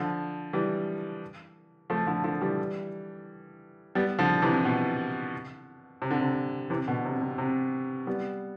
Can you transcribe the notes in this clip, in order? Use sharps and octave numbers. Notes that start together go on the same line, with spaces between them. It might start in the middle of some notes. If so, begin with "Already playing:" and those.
Already playing: D3 F3
E3 G3
F3 A3
D3 F3
D3 F3
E3 G3
G3 B3
D3 F3
C3 E3
B2
C3
D3
C3
C3 E3
B2 D3
C3
C3
C3
G3 B3